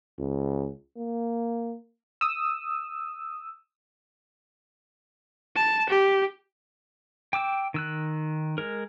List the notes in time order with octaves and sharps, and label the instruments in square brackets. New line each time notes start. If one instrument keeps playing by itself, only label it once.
[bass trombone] C#2
A#3
[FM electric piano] D#6 E6
[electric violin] A5
G4
[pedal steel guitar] G5 D6 E6
D#3 E6 F#6
G#3 A#4